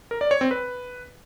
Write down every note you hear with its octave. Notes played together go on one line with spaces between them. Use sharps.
A#4
D5
C#5
C4
B4